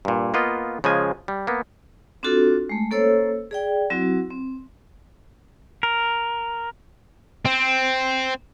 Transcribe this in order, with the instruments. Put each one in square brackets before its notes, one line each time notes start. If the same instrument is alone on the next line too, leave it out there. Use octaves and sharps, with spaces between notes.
[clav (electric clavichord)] G2 A#2
A#3 B3 F4 D#5
C#3 F3 G#3 G#5
G3
A#3 B3
[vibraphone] C4 D4 F4 F#4 A4
G#3 A3
A#3 C#4 A4 C5 C#5 E6
G#4 D5 G5
F#3 C4 E4 F#4
C4
[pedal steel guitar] A#4
[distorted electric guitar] C4